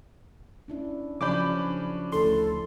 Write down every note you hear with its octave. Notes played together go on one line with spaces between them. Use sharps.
C#4 D4 E4
C#3 F3 F#3 C#4 D4 B5 D6 G6
D2 E4 A4 C6